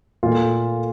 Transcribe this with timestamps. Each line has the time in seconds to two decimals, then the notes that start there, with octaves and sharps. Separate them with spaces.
0.23 A#2 A3 F4